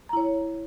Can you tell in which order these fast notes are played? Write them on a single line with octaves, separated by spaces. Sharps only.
A#5 E4 C#5